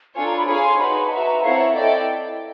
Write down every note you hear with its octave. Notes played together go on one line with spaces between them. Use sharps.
D4 F4 A4 C#5 G#5
A#5
B5
G#4 C#5 F5 G#5 B5
C6
D#4 F#4 B4 B5
A5
F#4 B4 E5 A#5
A#5
C4 E4 A4 C#5 F5 F#5
E5
E4 A4 D5 D#5 G5